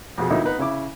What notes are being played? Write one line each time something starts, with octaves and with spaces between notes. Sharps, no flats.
F2 B2 G#4
D2 A#2 F#3 D#4 E4
B3 D#4 B4 A#5
C#3 E4 D6